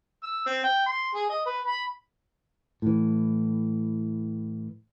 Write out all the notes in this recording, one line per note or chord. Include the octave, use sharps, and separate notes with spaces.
E6
C4
G5
C6
G#4
D#5
B4
B5
A2 E3